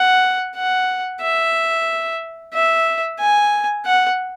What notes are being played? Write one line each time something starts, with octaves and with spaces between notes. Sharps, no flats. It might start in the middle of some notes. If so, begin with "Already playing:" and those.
Already playing: F#5
F#5
E5
E5
G#5
F#5